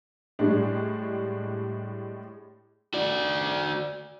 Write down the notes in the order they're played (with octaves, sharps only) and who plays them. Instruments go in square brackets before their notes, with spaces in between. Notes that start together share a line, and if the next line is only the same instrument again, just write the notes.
[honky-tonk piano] A2 G3 G#3 D4
[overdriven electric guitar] F#4 D5